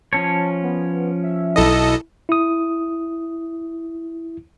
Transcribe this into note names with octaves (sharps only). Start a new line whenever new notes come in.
F3 C#4 C#5 A5
B3
E5
B1 E4 A4 D#5
E4 D#6